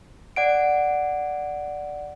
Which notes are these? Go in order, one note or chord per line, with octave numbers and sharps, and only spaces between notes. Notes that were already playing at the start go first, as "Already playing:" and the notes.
D5 F#5 D7